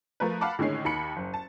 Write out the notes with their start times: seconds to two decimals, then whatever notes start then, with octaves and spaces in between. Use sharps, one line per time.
0.20 F3 A3 A#4 B4
0.41 F5 F#5 A5 B5 D6
0.59 A2 D3 D#3 G#3 C#4 C7
0.85 D#2 D#3 B5 C#7 F#7
1.16 F#1
1.34 A5